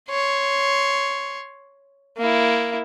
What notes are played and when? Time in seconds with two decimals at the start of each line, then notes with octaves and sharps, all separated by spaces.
0.10 C#5 C6
2.17 A#3 E4